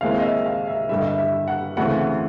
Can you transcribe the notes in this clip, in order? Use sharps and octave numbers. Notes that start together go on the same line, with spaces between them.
D#2 D#3 G#3 C4 E4 F5
D#5
E5
F5
E5
G2 D3 G3 E5
D#5
E5
E5
F#5
D2 C#3 E3 A3 C4 F#5
F#5